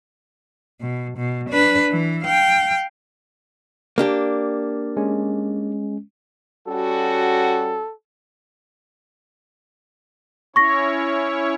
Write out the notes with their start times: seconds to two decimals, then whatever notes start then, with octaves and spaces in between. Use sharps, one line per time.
0.81 B2
1.17 B2
1.49 D4 B4
1.91 E3
2.23 F5 G5
3.98 A#3 D4 G4
4.97 G#3 C#4
6.68 G3 C#4 F#4 A4
10.56 C#4 E4 C#5 C#6 A#6